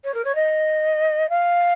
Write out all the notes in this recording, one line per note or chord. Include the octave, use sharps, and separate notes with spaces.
C#5
A#4
C#5
D#5
F5